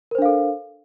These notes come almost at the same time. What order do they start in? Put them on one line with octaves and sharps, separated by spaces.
A#4 C5 D4 F5 A4